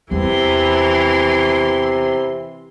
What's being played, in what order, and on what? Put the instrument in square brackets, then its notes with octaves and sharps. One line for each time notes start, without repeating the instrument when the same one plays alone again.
[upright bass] E2 [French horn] C3 [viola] E3 C6